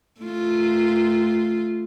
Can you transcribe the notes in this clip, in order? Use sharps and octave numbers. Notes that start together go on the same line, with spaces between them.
A3 F4